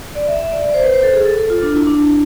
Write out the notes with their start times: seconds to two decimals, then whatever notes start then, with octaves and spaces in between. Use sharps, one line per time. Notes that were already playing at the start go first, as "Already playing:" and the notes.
0.15 D5
0.27 E5
0.40 E5
0.52 D5
0.64 D5
0.74 C5
0.83 B4
0.94 C5
1.03 A4
1.13 G#4
1.25 A4
1.38 A4
1.50 F4
1.63 D4
1.75 E4
1.87 D4